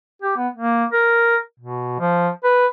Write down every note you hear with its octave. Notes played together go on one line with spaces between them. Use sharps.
G4
B3
A#3
A#4
B2
F3
B4